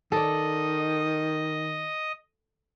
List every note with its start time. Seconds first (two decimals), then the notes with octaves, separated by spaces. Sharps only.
0.12 D#3 A4 D5 D#5